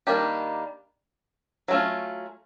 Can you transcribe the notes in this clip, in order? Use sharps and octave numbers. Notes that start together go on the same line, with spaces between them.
D#3 G3 A#3 D4 G4
F#3 A3 C#4 F4